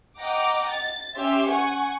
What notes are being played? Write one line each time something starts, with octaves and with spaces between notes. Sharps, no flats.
D#5 F#5 G5 A#5 D6
A6
C#4 G4 E5 C6
F#5 G#5 C#6